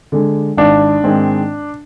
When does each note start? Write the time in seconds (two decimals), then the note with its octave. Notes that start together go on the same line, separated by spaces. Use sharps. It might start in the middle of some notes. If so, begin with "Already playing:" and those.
0.12 D3 G#3
0.57 G#1 D4
1.04 G#2 D#3 G#3 C4